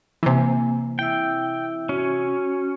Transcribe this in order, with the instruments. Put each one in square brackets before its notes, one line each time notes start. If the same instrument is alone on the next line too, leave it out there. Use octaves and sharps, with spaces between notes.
[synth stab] C3 E3 [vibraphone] A#3 G#5
[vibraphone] E4 E5 E6 [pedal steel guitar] G5
[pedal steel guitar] C#4 [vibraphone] F#4